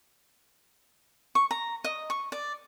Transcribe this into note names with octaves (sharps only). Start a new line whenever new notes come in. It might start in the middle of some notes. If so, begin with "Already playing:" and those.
C#6
A#5
D#5
C#6
D5